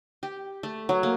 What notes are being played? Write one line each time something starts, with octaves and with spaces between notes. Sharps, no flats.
G4
A3
F#3
A#3